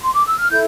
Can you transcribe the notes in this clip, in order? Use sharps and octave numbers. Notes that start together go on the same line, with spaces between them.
C6
D6
E6
F6
E4 A4 G6